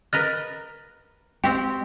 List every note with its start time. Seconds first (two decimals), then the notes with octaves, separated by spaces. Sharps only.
0.13 A#4 B4 D#5 F6 F#6 A6
1.44 G#3 C4 F#4 G4 G5